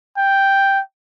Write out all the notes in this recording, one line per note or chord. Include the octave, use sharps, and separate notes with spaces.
G5